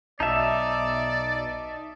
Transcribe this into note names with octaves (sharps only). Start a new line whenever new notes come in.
B1 D#4 D5 E5 A5 D#6 E6